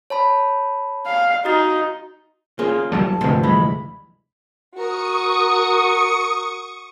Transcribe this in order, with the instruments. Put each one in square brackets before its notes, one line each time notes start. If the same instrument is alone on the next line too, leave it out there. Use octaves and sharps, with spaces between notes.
[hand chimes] C#5 A5 B5
[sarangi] F5
[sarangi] D#4 [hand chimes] F#4 D#6 A6
[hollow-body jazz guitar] A#3 C#4 F4 [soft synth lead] G#4
[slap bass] F#1 F#3 G3 [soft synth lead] A5
[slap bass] F1 D2 [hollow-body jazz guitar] G#2 C3
[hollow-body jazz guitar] G2 E3 G#3 [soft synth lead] B5
[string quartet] F#4 A#4 [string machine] C#6 D#6 C#7